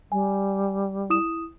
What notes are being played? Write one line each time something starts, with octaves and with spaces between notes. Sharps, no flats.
G3 G#5
E4 D#6 E7